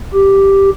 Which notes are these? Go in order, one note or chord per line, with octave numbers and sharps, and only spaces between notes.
G4